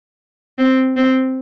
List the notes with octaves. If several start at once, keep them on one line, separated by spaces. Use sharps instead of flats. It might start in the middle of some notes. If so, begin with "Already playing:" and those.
C4
C4